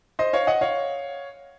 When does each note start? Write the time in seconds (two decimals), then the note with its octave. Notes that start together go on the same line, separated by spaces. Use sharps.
0.19 C5 D#5
0.33 C#5 F5
0.47 D#5 F#5
0.61 C#5 F5